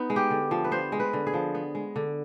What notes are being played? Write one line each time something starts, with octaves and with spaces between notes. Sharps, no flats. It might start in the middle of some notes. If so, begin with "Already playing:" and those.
Already playing: B3 D#4
G#3
G4
D3
F3
B4
B3 C5
G#3
B4
D3
G#4
F3
B3
G#3
D3